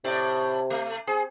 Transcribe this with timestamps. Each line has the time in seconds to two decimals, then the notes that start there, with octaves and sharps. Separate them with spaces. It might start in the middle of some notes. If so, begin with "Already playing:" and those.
0.04 A2 C3 D5
0.70 A3
1.07 C4 G#4